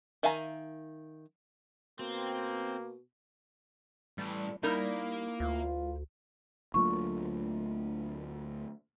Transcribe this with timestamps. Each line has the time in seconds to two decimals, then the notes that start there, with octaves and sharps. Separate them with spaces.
0.23 D#3 E5 F5 G#5 A#5
1.99 B2 A#3 C4
4.18 A2 E3 G3
4.63 G3 A#3 D#4 E4 A#4
5.40 D2 F4
6.74 D2 F#3 A3 A#3 D4 F4 C#6